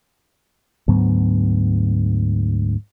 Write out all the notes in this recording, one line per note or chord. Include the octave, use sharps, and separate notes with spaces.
D2 G#2 F#3 B3